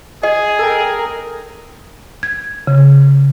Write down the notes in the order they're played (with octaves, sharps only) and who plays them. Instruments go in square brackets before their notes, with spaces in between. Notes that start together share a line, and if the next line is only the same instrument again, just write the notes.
[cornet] G#4 [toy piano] D#5
[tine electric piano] A4 G5 [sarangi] A#4
[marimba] G#6
C#3